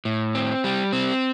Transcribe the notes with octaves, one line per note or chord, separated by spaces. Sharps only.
A2
C4
G3
C4